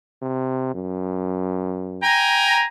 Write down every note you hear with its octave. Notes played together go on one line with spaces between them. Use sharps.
C3
F#2
G5 G#5 A#5